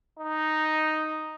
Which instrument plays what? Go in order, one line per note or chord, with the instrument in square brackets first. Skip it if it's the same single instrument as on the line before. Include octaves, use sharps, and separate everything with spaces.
[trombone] D#4